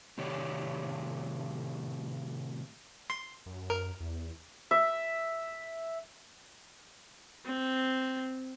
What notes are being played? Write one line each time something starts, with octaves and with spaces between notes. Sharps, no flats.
A2 C3 D#3 G4 C#5 D5
C6
F#2
A#4
E2
E5
C4